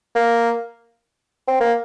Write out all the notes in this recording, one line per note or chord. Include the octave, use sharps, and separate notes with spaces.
A#3
C4
A#3